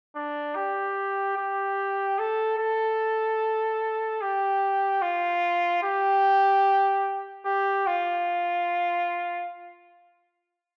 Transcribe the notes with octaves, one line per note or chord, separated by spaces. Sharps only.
D4
G4
G4
A4
A4
G4
F4
G4
G4
F4